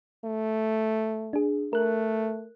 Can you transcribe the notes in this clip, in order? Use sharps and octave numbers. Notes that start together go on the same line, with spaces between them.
A3
D4 G#4
A3 A#4 F#6